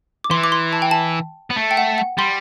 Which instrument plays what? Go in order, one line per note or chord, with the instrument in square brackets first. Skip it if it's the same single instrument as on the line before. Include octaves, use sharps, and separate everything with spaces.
[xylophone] D6
[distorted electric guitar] E3 [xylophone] C6
[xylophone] D6
C6
A5
G5
A5
[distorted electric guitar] B3
A3
[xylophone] G5
F#5
F#5
[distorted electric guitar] G3 [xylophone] C6